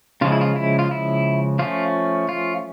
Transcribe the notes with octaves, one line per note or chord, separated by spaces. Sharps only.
C#3 F3 G#3 F4
E4
F4
E4
F4
E4
F3 A3 C#4 F4
F4